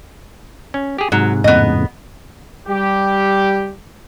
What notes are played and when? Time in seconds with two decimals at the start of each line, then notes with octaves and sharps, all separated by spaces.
0.74 C#4
0.98 G4 G#4
1.12 G#2 C3 F#3
1.44 F2 A2 C#3 B3 D#5
2.67 G3 G4